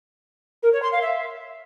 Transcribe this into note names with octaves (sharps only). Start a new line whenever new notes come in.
A#4
C#5
C6
F5
E5